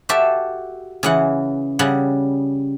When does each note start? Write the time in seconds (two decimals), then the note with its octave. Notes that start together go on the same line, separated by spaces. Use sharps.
0.09 F#4 G4 A4 E5
1.03 C#3 E3 F#5
1.79 C#3 G3 F#5